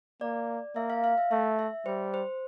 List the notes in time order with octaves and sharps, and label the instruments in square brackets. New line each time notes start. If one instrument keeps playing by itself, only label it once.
[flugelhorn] A#3 [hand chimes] D5
[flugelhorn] A#3 [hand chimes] E5
[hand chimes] F5
F5
E5
[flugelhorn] A3 [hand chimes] E5
[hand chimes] E5
[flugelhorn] G3 [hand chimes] C5
[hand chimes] C5